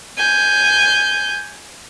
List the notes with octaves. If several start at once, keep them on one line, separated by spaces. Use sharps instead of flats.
G#5 G6